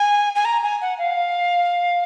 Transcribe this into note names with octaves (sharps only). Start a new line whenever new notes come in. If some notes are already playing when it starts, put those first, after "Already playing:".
Already playing: G#5
G#5
A#5
G#5
F#5
F5